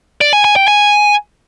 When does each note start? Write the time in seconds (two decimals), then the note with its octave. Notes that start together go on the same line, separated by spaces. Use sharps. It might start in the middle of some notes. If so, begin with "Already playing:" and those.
0.21 D5
0.33 G#5
0.45 G#5
0.56 G5
0.68 G#5